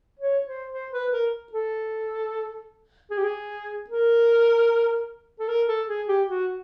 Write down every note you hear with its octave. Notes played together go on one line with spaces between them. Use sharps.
C#5
C5
C5
B4
A#4
A4
G#4
G4
G#4
A#4
A4
A#4
A4
G#4
G4
F#4